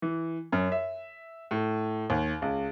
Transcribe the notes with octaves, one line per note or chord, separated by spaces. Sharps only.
E3
F#2
E5
A2
D#2
C#2